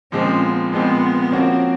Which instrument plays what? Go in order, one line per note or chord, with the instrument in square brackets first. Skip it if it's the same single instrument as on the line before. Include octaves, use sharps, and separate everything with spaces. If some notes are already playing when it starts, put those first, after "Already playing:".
[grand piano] A#2 F3 G#3 C4 [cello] C#4
[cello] B3
[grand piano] A#2 F3 G#3 C4 [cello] B3
[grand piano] F3 A#3 C#4 F#4 [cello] C4